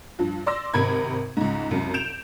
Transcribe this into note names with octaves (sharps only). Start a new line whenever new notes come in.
G2 F3
D5 C6 E6 A#6
G#1 C3 A#4 B5 G#6
C#2 G#2
C2 F#2
G6 D7 E7 F7